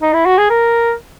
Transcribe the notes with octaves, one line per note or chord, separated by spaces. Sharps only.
D#4
E4
F#4
G#4
A#4